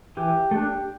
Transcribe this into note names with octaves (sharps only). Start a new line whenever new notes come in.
E3 G4
A3 D4